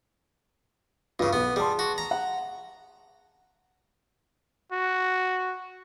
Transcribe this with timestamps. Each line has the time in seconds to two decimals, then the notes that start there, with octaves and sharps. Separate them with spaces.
1.19 G2 C#3 F4
1.33 B1 B3
1.56 G3 G#4 A5 C6
1.79 F#4
1.98 A#5
2.11 F#5
4.72 F#4